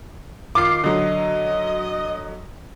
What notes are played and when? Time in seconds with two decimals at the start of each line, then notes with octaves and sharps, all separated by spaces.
0.55 D#3 F4 D6 C7
0.84 D3 F#3 D#5